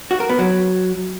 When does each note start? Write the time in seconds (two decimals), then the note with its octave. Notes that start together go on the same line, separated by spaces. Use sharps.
0.11 F#4
0.20 A#4
0.29 B3
0.39 F#3